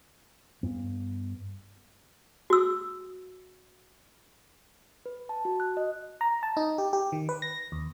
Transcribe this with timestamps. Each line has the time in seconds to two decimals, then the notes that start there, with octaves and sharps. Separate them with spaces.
0.63 G2 B3
2.50 F#4 E6
5.06 B4
5.29 A5
5.45 F#4
5.60 F#6
5.77 D#5
6.21 A#5
6.43 A5
6.57 D#4
6.78 G4
6.93 G4
7.12 D#3
7.29 B4
7.42 A#6
7.72 D#2